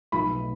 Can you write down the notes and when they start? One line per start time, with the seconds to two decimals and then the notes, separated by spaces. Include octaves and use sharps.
0.12 B1 B5
0.29 B2 A3